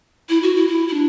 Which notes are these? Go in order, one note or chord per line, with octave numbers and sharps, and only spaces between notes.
E4
F#4
E4
E4
E4
D4